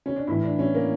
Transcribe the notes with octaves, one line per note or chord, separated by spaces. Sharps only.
C#4
D4
A2 E3 E4
D4
C#4
A#3